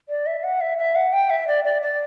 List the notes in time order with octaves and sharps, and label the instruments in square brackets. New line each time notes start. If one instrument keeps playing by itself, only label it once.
[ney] D5
E5
F#5
E5
E5
F#5
G5
E5
D5
D5
D5